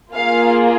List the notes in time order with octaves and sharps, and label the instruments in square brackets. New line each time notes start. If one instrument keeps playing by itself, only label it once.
[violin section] A#3 F4 G#4 F5